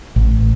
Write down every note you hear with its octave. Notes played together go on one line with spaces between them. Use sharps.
A1